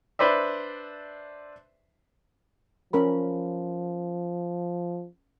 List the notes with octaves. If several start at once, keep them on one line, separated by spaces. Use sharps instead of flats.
D4 B4 C5 D5 E5
F3 C#4 A#4 B5